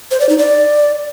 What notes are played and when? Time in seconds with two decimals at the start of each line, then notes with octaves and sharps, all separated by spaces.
0.11 C5
0.20 D5
0.29 D#4
0.38 D5